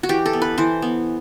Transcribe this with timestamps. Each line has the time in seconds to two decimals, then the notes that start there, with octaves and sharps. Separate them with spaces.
0.03 F#4
0.09 E3 G4
0.26 A4
0.33 B3
0.42 B4
0.58 E3 C5
0.82 B3